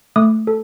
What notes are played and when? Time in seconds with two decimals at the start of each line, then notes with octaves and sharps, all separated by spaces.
0.16 A3 D#6
0.47 A4